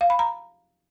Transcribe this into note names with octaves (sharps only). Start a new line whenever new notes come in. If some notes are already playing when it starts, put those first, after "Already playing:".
F5
B5
A#5